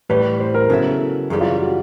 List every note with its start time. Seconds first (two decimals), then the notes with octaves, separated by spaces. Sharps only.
0.10 A2 E3 G3 B4
0.40 C5
0.54 A#4
0.70 C#3 F#3 B3 E4 A4
1.30 F#2 C#3 E3 G3 G#4
1.41 F4
1.60 F#4